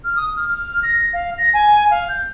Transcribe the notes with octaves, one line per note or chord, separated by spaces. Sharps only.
F6
D#6
F6
F6
A#6
F5
A#6
G#5
F5
G6